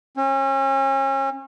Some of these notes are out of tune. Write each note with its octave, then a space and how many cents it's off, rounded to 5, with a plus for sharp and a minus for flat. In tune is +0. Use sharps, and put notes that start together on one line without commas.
C#4 -35